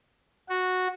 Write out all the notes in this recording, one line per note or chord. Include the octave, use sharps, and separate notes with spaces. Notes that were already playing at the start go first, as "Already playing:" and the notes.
F#4